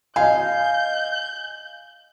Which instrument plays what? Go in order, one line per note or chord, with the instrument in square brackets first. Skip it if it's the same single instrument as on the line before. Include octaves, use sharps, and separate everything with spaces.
[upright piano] D#5 G#5 [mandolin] F5 [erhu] G6